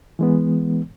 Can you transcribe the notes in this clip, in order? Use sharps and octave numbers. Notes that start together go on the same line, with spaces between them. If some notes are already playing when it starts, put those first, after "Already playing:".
E3 G#3 B3